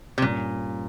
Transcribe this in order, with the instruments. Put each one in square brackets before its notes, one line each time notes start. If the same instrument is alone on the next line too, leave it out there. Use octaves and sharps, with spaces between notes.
[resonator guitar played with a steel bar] C3
[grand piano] G2 G3 C#4 [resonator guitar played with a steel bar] A#2